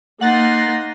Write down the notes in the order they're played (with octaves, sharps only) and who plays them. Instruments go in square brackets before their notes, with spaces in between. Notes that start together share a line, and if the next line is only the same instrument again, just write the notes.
[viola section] A#3 [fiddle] D#4 C6 [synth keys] F#5 [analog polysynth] F#6 A6 A#6